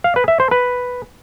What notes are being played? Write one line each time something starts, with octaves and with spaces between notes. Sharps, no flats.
F5
B4
E5
C5
B4